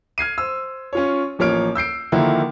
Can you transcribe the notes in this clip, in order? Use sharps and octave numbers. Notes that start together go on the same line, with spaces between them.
F6 G#6 C7 D#7
C5 E6
C#4 F4 C#5
A1 F3 A#3 C#5 F6 D7
E6 G6 C7 D7
D3 D#3 F3 A#3 E4